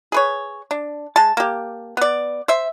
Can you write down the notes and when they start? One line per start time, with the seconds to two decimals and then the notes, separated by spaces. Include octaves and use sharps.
0.12 G#4 B4 C#5
0.71 D4
1.16 G#3 A5
1.37 A#3 G4
1.97 B3 D5
2.48 C5 E5